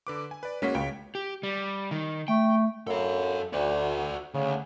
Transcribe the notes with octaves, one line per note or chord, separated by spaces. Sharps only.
D3 B4 D6
G#5
B4 D5
G#3 A#3 C#4 F#4 B6
C#2 C#5 G5 D7
G4
G3
D#3
A3 G5
F#2 A4 F5
D2 F#4 D5
D2 C#3